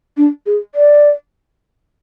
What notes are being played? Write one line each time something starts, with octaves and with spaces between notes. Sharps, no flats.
D4
G#4
D5